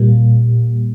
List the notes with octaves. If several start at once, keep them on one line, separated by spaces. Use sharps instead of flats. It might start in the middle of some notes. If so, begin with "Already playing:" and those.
Already playing: A#2 G3 A#3